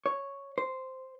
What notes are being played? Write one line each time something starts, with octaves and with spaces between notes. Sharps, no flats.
C#5
C5